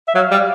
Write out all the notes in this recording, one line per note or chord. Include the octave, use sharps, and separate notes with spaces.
E5
F#3 F5
G3